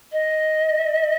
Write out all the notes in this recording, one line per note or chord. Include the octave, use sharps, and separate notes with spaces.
D#5